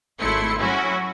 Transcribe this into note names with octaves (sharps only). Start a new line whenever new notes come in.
G#1 A3 E4 C6 C#7
F#3 C#4 E4 F#4